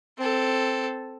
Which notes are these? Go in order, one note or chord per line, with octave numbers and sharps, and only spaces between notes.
C4 A4